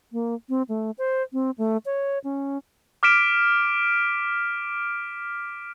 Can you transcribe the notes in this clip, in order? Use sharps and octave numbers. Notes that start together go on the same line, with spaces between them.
A#3
C4
A3
C5
C4
A3
C#5
C#4
D6 F6 B6 D7 E7